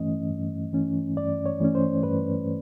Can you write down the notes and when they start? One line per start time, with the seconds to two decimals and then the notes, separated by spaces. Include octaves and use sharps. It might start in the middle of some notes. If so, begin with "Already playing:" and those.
Already playing: G2 E3 A3 C#4 D#5
0.30 G2
0.73 E3 A3 C#4
1.17 G2 D5
1.46 C#5
1.60 E3 A3 C#4
1.75 C5
2.03 G2 B4